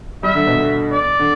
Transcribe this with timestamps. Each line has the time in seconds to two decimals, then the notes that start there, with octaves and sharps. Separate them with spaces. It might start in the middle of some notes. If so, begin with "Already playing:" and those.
0.23 G3 E5
0.35 D3
0.47 B2
0.58 D3
0.92 D5
1.19 D3